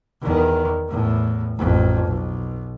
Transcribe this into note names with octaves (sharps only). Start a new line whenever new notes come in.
E2 D#3
E2 A2
A1 F2
B1